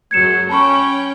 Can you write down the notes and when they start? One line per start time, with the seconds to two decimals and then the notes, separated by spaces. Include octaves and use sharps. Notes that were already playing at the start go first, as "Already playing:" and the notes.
0.11 F#2 F#3 G#3 G#6 C#7 E7
0.49 C#4 G5 A5 B5 C#6